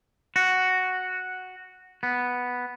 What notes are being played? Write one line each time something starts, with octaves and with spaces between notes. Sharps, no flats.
F#4
B3